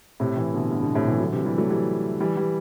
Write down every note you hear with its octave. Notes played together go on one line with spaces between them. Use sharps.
A2 C3
C3 E3
B2 D3
G2 B2
B2 D3
A2 C3
C3 E3
D3 F#3
C3 E3
E3 G3
F#3 A3
E3 G3
E3 G3
E3 G3